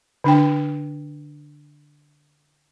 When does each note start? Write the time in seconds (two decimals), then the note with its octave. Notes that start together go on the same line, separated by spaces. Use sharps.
0.24 D3 D4 G5